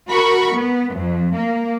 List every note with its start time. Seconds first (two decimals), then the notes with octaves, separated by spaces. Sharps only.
0.10 F#4 A#4 B5 C#6
0.54 B3
0.94 F2
1.36 A#3